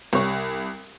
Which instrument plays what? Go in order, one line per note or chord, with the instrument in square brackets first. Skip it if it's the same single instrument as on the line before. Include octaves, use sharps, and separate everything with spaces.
[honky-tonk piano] C2 [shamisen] G3 C#5